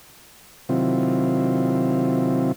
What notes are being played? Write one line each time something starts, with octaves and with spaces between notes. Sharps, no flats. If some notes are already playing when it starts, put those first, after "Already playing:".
C3 D#3 F#3 C4 E4 F4